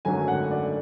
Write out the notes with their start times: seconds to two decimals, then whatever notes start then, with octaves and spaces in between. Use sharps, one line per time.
0.05 G#1 F#2 D3 F#3 A3 G#5
0.28 F#5
0.51 D5